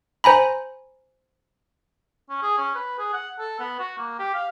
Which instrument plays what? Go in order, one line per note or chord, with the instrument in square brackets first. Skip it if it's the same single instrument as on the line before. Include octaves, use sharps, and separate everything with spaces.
[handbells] C5 G#5 A#5 B5
[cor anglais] C#4
G#4
C#4
B4
G#4
F#5
A4
B3
F#4
A#3
G4
F5